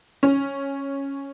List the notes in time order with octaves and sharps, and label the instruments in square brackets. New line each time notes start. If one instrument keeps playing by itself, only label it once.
[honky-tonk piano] C#4